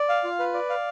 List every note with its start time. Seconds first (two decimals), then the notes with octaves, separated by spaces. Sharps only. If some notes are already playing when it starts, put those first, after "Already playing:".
Already playing: D5
0.09 F5
0.24 F4
0.39 B4
0.54 D5
0.70 F5